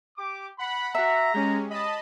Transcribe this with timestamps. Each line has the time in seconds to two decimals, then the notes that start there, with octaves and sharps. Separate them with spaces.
0.18 G4 D6
0.59 F#5 B5
0.95 F#4 E5 A#5
1.34 G#3 C#4 G4
1.70 D#5 A5 B5